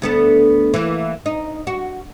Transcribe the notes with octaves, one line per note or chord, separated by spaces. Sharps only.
D2 B3 A4
E3 A#3
D#4
F#4